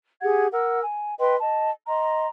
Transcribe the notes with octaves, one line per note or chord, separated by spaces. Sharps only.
G4 G#4 F#5 G#6
A#4 F#5 E6
G#5
B4 D#5 G5 C6
D#5 A5
D#5 A#5 C6